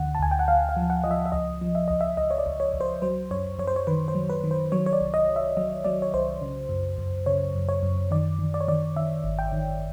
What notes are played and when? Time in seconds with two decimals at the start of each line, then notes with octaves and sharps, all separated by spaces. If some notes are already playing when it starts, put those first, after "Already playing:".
Already playing: D2 D3 F#5
0.15 A5
0.19 D2 G#5
0.31 G5
0.39 F#5
0.48 D2 F5
0.69 F5
0.76 F3
0.90 F#5
1.04 F3 D#5
1.11 E5
1.26 E5
1.32 C#2 D#5
1.61 F3
1.75 E5
1.88 C#2 D#5
2.01 E5
2.17 C#2 D#5
2.31 C#5
2.38 D5
2.46 C#2
2.60 C#5
2.73 C#2
2.81 C5
3.02 F#3 C5
3.31 F#2 C#5
3.59 F#2 C#5
3.67 C5
3.76 C#5
3.87 D#3 B4
4.08 C5
4.15 F#3
4.30 B4
4.44 D#3
4.51 C5
4.72 F#3 C#5
4.86 C#5
4.93 D5
5.01 C2
5.14 D#5
5.29 C2
5.36 E5
5.57 F#3 D#5
5.85 F#3 D5
6.02 C#5
6.14 C2 C5
6.41 C#3
6.69 F#2
6.98 F#2
7.26 C#3 C#5
7.55 F#2
7.69 C#5
7.83 F#2
8.11 D#3 D5
8.39 D#3
8.54 D5
8.61 C#5
8.68 D#3 D5
8.96 D#3 E5
9.24 G#1
9.39 G5
9.52 D#3